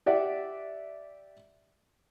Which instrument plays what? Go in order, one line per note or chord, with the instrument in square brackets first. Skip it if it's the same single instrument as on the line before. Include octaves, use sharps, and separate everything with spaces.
[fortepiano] G4 D5 E5 F#5